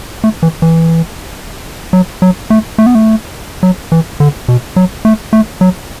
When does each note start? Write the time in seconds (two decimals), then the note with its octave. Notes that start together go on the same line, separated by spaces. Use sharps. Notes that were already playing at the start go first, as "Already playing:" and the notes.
0.24 A3
0.43 E3
0.62 E3
1.93 F#3
2.22 F#3
2.50 A3
2.78 A3
2.86 B3
2.95 A3
3.63 F#3
3.92 E3
4.20 D3
4.48 B2
4.76 F#3
5.05 A3
5.33 A3
5.61 F#3